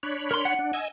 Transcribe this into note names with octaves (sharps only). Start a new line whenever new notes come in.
D4 C#5 B5
A#4 C6
F#5
D4
D#5 G#5 E6